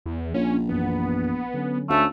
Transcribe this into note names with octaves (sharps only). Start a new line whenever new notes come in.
E2
A#1 A#3 C#4 D4 F4
F#2 E3 B3
D3 F#3 C#4
D2 A3 C#4 F5